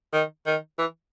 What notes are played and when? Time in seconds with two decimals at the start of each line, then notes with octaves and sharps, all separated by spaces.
0.13 D#3
0.46 D#3
0.79 E3